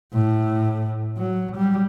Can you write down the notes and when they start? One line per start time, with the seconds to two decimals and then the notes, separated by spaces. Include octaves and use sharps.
0.13 A2
1.17 F#3
1.56 G3